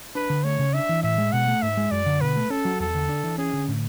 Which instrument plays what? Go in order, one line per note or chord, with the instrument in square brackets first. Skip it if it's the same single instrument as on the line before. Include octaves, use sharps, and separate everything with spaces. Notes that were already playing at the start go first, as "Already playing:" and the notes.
[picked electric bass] D4 [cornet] B4
[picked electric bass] D3
[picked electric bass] A3 [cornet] C#5
[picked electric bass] C#3
[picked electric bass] D4 [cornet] E5
[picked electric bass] E3
[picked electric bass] A2 [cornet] E5
[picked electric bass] G#3
[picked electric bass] B2 [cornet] F#5
[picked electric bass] A3
[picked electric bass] G#2 [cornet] E5
[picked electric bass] G#3
[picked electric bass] F#2 [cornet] D5
[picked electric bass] D3
[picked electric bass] B2 [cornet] B4
[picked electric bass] A3
[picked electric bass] C#4 [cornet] A4
[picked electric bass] F#3
[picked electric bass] E2 [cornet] A4
[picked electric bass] D3
D4
E3
[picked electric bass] C#4 [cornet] G#4
[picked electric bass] D3
A2